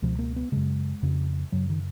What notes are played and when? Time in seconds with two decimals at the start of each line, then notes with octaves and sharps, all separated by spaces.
0.02 C#2 B2 F3
0.19 A#3
0.36 B3
0.52 F#2 C#3 G#3
1.03 F2 C#3
1.52 F#2 C#3 F#3
1.70 D#3